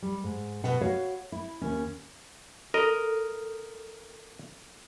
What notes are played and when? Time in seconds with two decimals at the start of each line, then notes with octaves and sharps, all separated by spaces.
0.02 G3
0.24 G#2
0.64 B2 F#5
0.81 F#4 C#5 F5
1.32 E4
1.61 D#2 C#4
2.74 A4 A#4 D#5